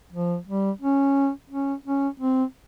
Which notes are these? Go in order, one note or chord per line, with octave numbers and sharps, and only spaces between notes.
F3
G3
C#4
C#4
C#4
C4